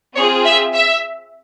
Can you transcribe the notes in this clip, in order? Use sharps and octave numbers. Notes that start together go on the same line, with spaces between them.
C4 F4 G#4 C#5
E5
E5